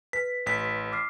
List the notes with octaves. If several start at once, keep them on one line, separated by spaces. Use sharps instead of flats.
B4 B6
A1 B6
D6 F6 C7